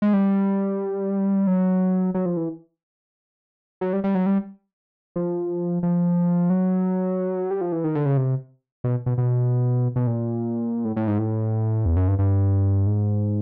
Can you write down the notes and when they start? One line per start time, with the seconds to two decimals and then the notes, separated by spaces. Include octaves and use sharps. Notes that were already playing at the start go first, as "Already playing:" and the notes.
0.02 G#3
0.14 G3
1.47 F#3
2.14 F#3
2.26 F3
2.37 E3
3.81 F#3
3.93 G3
4.04 G3
4.15 F#3
4.26 G3
5.16 F3
5.83 F3
6.50 F#3
7.51 G3
7.61 F3
7.72 E3
7.84 D#3
7.95 D3
8.06 C#3
8.17 C3
8.84 B2
9.06 B2
9.18 B2
9.96 B2
10.07 A#2
10.85 A2
10.96 A2
11.08 G#2
11.18 A2
11.86 E2
11.97 F#2
12.08 G2
12.19 G2
12.87 G#2